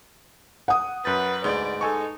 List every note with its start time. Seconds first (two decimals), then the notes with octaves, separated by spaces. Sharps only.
0.68 F#5 D#6
1.05 F#2 B4 G6 A6
1.44 D2 G#2 D5
1.81 D#4 A4 G#5 C#6